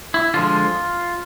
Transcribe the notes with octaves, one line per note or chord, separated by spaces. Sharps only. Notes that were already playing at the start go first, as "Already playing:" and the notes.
E4
D3 F3 G#3 F4